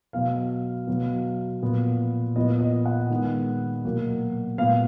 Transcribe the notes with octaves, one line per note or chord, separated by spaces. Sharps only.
B2 F#3 B3 F5
B2 F#3 B3
A#2 F3 B3
A#2 F3 B3 D#5
D#5
F#5
D#3 G#3 B3
B2 F#3 A#3
A#2 G#3 B3 F5